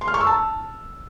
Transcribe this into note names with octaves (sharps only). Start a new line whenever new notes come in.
C6
F6
C#6
E6
A5